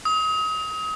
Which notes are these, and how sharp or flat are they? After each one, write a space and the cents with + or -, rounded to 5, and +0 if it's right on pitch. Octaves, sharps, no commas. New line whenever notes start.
D#6 +35